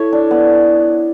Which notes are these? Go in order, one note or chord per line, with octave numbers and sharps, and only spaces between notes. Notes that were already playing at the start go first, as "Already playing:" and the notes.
Already playing: E4 A4 C#5 E5
D4
B3